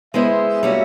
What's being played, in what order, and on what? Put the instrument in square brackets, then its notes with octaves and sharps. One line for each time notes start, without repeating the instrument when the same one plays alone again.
[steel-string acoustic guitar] G#3 B3 E4 G#4 C5 [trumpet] E5
[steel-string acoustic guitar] G3 A#3 C#4 F#4